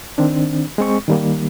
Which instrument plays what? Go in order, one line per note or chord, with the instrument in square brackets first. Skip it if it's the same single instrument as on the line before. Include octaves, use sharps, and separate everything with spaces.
[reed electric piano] D#3 C4 D4
G#3 C4 C#6
D#3 G3 A#3